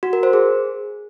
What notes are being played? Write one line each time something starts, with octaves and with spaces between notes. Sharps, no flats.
F#4
A#4
C5
G#4